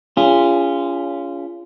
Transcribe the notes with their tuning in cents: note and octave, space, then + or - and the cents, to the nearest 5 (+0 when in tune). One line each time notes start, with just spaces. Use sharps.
C#4 +30 F4 -20 G#4 -25